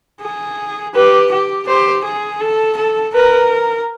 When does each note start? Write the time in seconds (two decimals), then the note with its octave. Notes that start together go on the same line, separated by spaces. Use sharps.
0.22 G#4
0.95 G4 B4
1.31 G4
1.68 G4 C5
2.04 G#4
2.41 A4
2.77 A4
3.14 A#4 B4